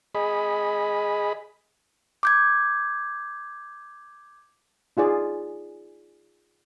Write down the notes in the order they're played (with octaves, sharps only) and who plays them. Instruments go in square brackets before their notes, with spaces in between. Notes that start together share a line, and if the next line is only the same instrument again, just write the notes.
[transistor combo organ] G#4 D#5 B5
[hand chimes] D6 G6 G#6
[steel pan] D#4 F4 G#4 D5